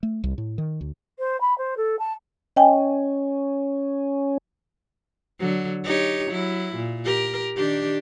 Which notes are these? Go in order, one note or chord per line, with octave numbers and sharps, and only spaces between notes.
A3
C2
A2
D#3
D2
C5
B5
C5
A4
A5
C#4 D#5 G5 G#5
D3 F#3
D#4 G4 C#5
F#3 E4
A#2
G4 A#4
D#3 D4 G4